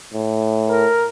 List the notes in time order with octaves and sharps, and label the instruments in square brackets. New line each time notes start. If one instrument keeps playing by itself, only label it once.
[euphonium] A2
[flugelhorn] A#4